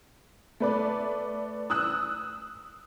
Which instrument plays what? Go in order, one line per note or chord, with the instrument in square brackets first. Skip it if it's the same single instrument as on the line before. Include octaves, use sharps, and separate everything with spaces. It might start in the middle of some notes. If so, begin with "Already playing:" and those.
[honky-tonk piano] A3 B4 D5
D#6 E6 F#6